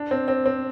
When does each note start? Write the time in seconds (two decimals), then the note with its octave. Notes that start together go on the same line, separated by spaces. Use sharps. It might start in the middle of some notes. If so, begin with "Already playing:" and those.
Already playing: D4
0.11 C4
0.28 C4
0.46 C4